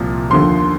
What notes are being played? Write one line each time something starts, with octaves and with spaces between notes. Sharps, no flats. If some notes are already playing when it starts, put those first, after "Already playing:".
Already playing: C2 A#2 F3
D#2 D3 F3 C6